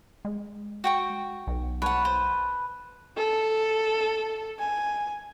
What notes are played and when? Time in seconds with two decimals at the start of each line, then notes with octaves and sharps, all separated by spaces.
0.25 G#3
0.84 F#4 G5 C#6
1.47 B1
1.82 B4 C#5 F#5 A5
2.05 C5
3.17 A4
4.59 G#5